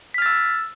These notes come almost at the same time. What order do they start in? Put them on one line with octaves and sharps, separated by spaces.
B6 F6 A6 E6